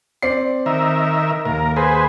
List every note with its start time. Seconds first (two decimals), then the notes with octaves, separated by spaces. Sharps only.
0.22 C4 D5 C7
0.66 D#3 A#4 E5
1.45 D#2 A#4
1.76 G#4 B4 C5